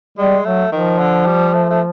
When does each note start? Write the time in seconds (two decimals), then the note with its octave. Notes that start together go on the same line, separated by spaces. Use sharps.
0.18 G3 G#3
0.45 F#3 A3
0.72 D#3 F3
0.99 D3
1.26 G3
1.54 A3
1.70 A3